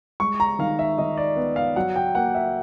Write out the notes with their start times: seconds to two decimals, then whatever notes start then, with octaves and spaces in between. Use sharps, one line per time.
0.20 G#3 C#6
0.40 A#5
0.59 D#3 F5
0.79 E5
0.98 D#3 D#5
1.17 D5
1.37 B3
1.56 F5
1.76 F#3 F#5
1.96 G5
2.15 A#3 F#5
2.35 E5